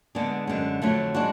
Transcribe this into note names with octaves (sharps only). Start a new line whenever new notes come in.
D3 G#3 B3 D4 G#4
F#2 D3 G#3
F2 D3 F#3 A3
G#3 D4 F#4